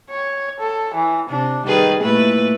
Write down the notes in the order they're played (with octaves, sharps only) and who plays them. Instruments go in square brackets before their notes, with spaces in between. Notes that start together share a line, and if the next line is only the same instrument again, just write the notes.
[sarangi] C#5
A4
E3
[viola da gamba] C3 [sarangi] D4
[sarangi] D#3 [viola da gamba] G3 G#4 B4
[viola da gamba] A#2 A3 B4 [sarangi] E4